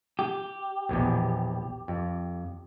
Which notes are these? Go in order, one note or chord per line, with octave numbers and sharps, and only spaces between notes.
G4
A#1 E2 B2
F2